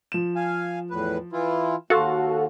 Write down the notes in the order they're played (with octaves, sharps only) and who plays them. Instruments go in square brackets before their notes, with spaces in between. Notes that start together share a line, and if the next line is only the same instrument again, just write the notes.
[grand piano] F3 E7
[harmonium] F5 G#5
E2 A2 B4
E3 E4 F4
[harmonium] D#2 [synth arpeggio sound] F#4 A4 [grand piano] F5 C6